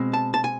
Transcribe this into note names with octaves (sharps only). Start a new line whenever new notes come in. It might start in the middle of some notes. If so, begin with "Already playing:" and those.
Already playing: B2 G#3 C4
A5
A5
G#5